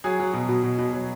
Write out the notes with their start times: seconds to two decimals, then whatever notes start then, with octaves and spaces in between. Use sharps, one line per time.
0.04 F#3 G#4
0.20 F#3
0.33 B2
0.48 B2
0.64 B2
0.78 B2
0.93 F#3